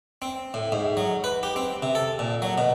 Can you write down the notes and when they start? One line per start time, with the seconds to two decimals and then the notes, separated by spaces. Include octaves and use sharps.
0.22 C4
0.54 A2
0.72 G#2
0.97 F#3
1.24 B4
1.43 G4
1.56 C4
1.83 C3
1.95 A4
2.19 A#2
2.42 F#3
2.58 B2